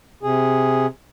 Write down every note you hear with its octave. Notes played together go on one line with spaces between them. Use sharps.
C3 G#4